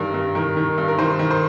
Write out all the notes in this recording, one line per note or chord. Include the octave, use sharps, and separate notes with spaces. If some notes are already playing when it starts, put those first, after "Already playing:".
Already playing: G2 D#3 A#4
G2
D#3 A#4
D#3
G2
A#4
D#3 C5
D#3
C5